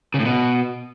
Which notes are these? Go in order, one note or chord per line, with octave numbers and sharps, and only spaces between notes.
C#3
A2
B2